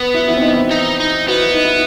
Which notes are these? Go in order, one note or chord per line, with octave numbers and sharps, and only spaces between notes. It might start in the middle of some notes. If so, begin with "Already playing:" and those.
Already playing: B3
E4
E4
C4
D#4
E4
D#4
D#4
B3 F#4
E4
D#4
E4